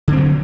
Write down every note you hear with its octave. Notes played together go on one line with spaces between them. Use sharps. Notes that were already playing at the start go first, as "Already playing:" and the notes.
D3 F#3 C4